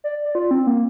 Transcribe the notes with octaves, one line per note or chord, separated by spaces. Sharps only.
D5
D5
F4
C4
A#3